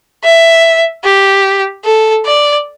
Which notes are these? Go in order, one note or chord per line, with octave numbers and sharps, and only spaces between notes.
E5
G4
A4
D5